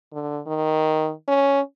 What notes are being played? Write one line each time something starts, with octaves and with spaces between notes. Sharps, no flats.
D3
D#3
C#4